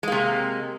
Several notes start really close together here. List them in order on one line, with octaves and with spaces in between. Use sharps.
G#3 A#3 C3